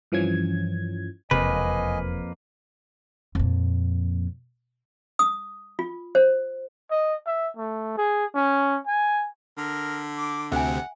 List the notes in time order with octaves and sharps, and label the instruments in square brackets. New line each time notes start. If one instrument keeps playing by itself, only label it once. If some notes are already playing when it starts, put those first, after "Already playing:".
[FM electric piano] G2 E3 F3 C#4 G#6
[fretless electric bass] E1 C3 [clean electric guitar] F2 A#3 B4 [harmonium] D#5 G#5
[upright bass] F2 A#2
[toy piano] D#6
F4
C5
[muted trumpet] D#5
E5
A3
G#4
C#4
G#5
[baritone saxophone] D3 [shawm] A#4
[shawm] D6
[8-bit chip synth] D2 C3 [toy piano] E5 G#5 [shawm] F#5